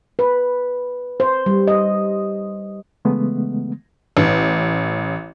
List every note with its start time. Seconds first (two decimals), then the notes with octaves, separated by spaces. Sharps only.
0.19 B4
1.20 C5
1.46 G3
1.68 D#5
3.05 C#3 E3 G#3 A3 B3
4.17 A1